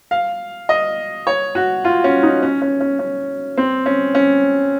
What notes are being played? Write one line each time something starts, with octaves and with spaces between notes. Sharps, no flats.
F5
D#5
C#5
F#4
F4
C#4
D#4
C#4
C#4
C#4
C#4
C4
C#4
C#4